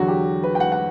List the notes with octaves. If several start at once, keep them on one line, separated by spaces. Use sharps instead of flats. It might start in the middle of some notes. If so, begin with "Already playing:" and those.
Already playing: E2 D3 F#3 F#4
G4
B4
G5
F#5
F#5